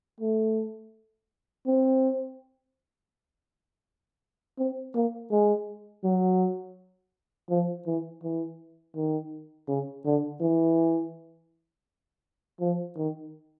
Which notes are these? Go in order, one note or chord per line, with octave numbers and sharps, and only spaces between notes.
A3
C4
C4
A#3
G#3
F#3
F3
E3
E3
D#3
C#3
D3
E3
F3
D#3